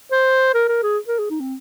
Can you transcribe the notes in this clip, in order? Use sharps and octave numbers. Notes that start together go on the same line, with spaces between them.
C5
A#4
A#4
G#4
A#4
G#4
D#4
C4